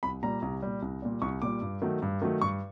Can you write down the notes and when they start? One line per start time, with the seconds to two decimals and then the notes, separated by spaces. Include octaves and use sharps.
0.03 C2 B5
0.23 A#2 G3 A#5
0.42 C2
0.63 A#2 G3
0.82 C2
1.02 A#2 G3
1.22 C2 C#6
1.42 A#2 G3 D6
1.62 G2
1.82 D#3 F#3 A3
2.02 G2
2.22 D#3 F#3 A3
2.42 G2 C#6